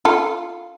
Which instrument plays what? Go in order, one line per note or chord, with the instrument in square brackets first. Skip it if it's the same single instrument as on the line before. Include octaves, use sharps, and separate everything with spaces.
[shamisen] F4 A4